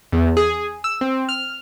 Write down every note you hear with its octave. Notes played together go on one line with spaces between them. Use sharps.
E2
G#4
E6
C4
F6